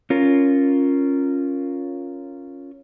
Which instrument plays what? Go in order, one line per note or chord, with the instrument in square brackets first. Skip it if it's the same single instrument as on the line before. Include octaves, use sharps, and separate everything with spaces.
[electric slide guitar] C#4 F4 A#4